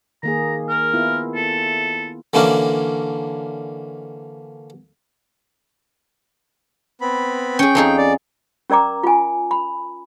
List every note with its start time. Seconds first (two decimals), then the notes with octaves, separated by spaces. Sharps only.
0.23 D#3 A#3 G#4 A#5
0.69 A#4
0.94 B3 E4 F4
1.35 A4
2.34 D3 E3 A#3 C#4 D4 F#4
7.01 B3 C4 B5
7.59 C#4 G#4 G5
7.75 F2 D#4 G#4
7.98 D5
8.70 C#4 A#4 D5 A#5 D6
9.03 F4 G#5
9.51 B5